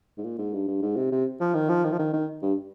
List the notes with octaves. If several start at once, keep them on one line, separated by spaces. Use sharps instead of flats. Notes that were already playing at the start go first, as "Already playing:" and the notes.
G#2
A#2
G#2
G2
G2
G#2
C3
C3
F3
D#3
F3
D#3
F3
D#3
D#3
G2